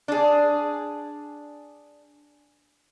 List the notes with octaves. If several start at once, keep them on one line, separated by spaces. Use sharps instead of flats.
D4 G#4